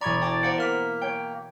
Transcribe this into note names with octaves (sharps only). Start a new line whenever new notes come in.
E1 D5 A#5 B5 C#6 G#6
G5 A5 D6 A6
C5 F5 F#5 A#5 C#7 D7
A#3 A#4 F6 B6
C#5 G5